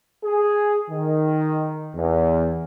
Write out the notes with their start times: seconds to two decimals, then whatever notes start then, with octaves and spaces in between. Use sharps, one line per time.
0.25 G#4
0.91 D#3
1.96 E2